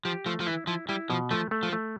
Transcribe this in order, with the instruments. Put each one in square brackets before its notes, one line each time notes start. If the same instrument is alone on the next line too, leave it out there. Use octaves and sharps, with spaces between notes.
[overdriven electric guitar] F3 [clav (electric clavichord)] G4
[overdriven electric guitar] F3 [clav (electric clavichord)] A3
[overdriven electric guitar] F3
[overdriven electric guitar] E3 [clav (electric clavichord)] E4
[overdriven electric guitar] F3 [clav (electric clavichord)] E4
[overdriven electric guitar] G3 [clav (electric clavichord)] E4
[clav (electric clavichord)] B2 [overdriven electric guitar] F3
[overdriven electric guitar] F3 [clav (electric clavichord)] A3
[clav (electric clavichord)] A3
[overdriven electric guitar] F3
[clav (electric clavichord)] A3